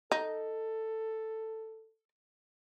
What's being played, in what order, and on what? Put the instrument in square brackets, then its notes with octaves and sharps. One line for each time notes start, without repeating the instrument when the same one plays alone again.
[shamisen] D#4 [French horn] A4